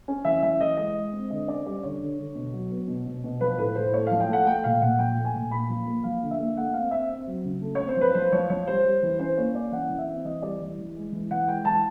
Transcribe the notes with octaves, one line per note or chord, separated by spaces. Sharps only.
C#4
E3 E5
E3 E5
E3 D#5
G#3 D#5
G#3
C4
D3 D#5
C#4 D5
G3 D5
D3 C#5
D3
D3
B2
F#3
B3
B2
B2
B2
F3 B4
A2 B4
A2 C5
A3 C#5
F3 F5
G5
A3 F#5
A3 G5
A#2 F5
A#2 F#5
F3 G5
A3
G#5
A#2
A#3 B5
F3
A#3
F3 F5
D3
E5
A#3
A3 F#5
C4 F5
C4 E5
C4
F#3
C#3
A3
C4 C#5
C5
F3 B4
F3 C5
F3 C#5
F3 C#5
G3 C5
G3
E3
C#4 C5
A#3 C#5
C#4 D5
E3 F#5
E3
E5
C4
E3 D#5
G3 D5
E3
E3
G#3
E3
E3 F#5
G#3 G5
E3 A5